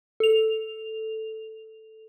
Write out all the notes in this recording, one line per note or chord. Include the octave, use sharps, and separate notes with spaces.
A4 F7